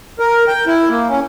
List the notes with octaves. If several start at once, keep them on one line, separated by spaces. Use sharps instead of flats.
A#4
G5
E4
A#3
C#4